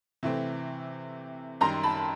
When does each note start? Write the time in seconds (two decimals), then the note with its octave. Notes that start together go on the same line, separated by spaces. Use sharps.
0.23 C3 E3 A3 C4
1.61 F#2 D#3 G3 A#5 C6
1.83 A5 B5